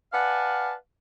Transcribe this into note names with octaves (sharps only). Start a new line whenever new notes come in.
B4 D5 F5 F#5 G#5 A5